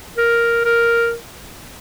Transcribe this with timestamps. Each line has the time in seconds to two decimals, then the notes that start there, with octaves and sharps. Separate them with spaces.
0.18 A#4
0.65 A#4